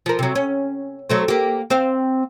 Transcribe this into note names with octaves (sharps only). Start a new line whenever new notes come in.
F3 A#4
C3 F#3
C#4
F#3 A3 C4
A#3 G4
C4 C5 F5